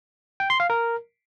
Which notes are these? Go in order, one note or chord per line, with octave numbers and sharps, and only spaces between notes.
G5
C6
F5
A#4